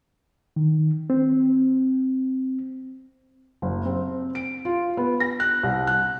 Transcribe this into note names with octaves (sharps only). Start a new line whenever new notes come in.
D#3
C4
F#1
C4
D7
F4
B3
A#6
F#6
C2
F#6